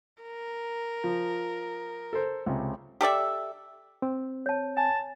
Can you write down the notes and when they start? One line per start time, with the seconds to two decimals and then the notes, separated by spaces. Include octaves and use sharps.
0.23 A#4
1.04 F3
2.13 A4 C5
2.46 C#2 C3
3.01 G4 A4 D5 E5
4.02 C4
4.46 C#5 A5
4.77 G#5 A5